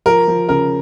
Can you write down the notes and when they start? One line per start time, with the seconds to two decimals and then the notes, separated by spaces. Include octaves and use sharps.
0.06 F3 A#4
0.28 F3
0.49 C#3 A#4